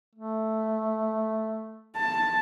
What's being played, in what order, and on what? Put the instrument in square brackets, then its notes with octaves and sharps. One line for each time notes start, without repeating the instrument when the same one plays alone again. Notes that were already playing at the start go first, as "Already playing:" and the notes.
[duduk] A3
[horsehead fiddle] A5